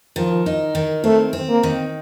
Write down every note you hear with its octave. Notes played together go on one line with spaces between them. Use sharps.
D#3 F3
D#4
D#3
A3 C4
C4
A#3
D#3